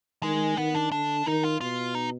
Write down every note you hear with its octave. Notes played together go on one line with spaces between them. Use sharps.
D#3 G#3
D#3 B3
D4
D3 D4
D#3 D#4
F4
B2 F4
D#4